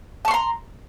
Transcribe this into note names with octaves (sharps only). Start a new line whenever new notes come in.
A5 A#5 C6 C#6